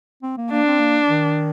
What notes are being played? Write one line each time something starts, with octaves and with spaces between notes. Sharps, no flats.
C4
A#3
A#3 D4
C4
A#3
D#3